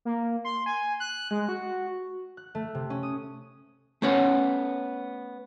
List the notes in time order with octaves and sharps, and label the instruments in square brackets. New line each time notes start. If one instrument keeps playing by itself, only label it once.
[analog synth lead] A#3
C6
G#5
F#6
G#3
F#4
[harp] F#6
A3
C3
C#4
D#6
[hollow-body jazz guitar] A3 B3 C#4 C#5 F#5